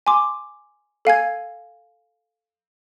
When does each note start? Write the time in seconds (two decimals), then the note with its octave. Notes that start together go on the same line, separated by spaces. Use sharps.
0.07 G#5 C6 D6
1.05 A4 F5 G#5 G#6